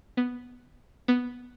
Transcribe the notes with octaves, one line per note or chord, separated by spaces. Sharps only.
B3
B3